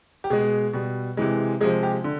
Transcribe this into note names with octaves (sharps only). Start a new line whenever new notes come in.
G4
B2 G#3 G#4
B2 G3
C3 E3 G#3
C3 F3 G#3 G#4
G4
D3